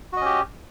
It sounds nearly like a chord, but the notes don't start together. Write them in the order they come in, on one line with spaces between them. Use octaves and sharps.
F#4 D#5 C#4 G4